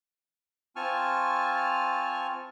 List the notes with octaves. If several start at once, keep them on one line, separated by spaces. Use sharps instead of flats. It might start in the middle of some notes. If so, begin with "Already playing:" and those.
C4 F4 G#5 A5 C#6 F6